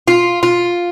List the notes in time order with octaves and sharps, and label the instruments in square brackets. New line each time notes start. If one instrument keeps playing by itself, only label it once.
[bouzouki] F4
F4